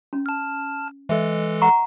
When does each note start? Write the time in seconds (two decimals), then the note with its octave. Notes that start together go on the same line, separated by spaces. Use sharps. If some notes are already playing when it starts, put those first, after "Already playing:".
0.13 C#4
0.26 A5 F6
1.09 E3 G#3 A4 D#5 E5
1.62 F#5 A#5 C#6